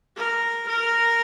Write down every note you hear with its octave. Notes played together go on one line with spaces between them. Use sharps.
A#4
A#4